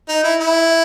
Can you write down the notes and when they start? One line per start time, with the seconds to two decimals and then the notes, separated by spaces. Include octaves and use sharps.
0.09 D#4
0.24 E4
0.40 E4